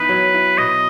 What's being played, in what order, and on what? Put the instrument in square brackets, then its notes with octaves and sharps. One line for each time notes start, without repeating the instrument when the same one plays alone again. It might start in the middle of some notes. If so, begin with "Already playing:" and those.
Already playing: [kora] E3 B3 D#4 [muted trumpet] B4
[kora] F#3
E4
[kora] B2 [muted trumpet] D#5